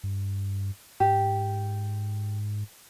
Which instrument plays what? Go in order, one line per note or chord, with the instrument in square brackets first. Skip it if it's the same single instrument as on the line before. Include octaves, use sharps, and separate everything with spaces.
[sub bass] G2
[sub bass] G#2 [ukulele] G4